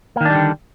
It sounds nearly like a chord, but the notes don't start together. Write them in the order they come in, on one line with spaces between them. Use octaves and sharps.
A#3 D#3 D4 G3 D3